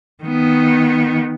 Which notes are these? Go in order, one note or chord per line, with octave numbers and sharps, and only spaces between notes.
D#3 B3